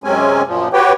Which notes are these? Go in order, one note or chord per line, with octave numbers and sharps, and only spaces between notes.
F#2 C3 G#3 C4 C#4 G#5
F#2 A#2 F3
F#4 G4 B4 C#5 G5